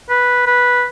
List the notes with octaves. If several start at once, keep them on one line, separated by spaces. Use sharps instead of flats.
B4
B4